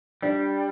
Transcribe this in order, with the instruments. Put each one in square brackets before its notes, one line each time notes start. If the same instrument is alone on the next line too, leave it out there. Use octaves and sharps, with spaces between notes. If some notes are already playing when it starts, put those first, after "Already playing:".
[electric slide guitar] G3 [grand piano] D4